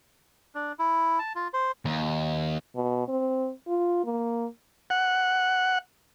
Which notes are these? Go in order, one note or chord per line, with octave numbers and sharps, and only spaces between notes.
D4
E4
A5
F4
C5
D#2
B2
C4
F4
A#3
F#5